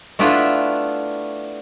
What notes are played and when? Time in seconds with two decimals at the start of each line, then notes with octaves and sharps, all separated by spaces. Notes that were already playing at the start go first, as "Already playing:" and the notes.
0.19 A3 B3 D4 E4 F4